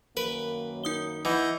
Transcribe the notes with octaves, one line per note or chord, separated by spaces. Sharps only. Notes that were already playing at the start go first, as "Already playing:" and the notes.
F#2 D#3 A#3 A#4 B4
D#4 D#6 G7
E3 D#5 F#5 G6